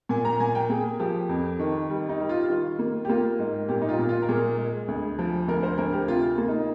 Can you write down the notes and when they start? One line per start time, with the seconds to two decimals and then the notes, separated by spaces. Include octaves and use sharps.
0.09 A#2 G#5
0.25 A#5
0.40 A#2 G#5
0.55 G5
0.69 A#3 G#4
0.99 F3 G4
1.29 F2
1.59 D#3
1.90 G3
2.09 D#4
2.20 G3
2.29 F4
2.49 D#3 F4
2.79 A#3
3.05 G4
3.09 A#3 F4
3.39 G#2
3.68 A#2 G4
3.82 D#4
3.89 F4
3.99 A#2
4.09 F4
4.22 A#4
4.29 A#2 G#4
4.58 G#3
4.88 D2
5.19 F3
5.48 D2 A#4
5.63 C5
5.78 D2 A#4
5.93 G4
6.08 C3 F4
6.38 A#3
6.48 D#4